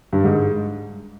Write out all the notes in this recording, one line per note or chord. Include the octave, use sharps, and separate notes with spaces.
G2
G#2